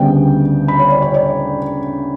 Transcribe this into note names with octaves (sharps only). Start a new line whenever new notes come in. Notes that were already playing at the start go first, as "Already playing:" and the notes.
Already playing: D2 C#3 G3 B3 G5
B5
C#5
D5
C#5
D5